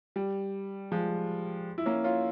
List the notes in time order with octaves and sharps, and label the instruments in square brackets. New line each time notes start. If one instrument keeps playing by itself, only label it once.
[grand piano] G3
F3 G#3
E4
A#3 C#4
C#4 F4